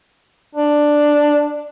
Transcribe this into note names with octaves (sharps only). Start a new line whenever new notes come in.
D4